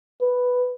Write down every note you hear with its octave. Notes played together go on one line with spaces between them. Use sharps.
B4